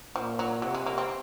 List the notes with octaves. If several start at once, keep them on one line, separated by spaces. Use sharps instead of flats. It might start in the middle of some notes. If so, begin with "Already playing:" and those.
A#2 F3
F#3
C3 F#3
G#3
A#3
C4